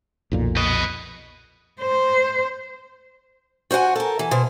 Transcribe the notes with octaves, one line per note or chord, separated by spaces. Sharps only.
B1 F2 A#2
B4 D#5
C5
F#4 C5 D#5 F#5 G#5
A4 A#4
E3
B2 C5